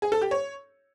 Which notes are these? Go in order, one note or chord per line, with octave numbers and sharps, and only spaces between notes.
G#4
A4
G4
C#5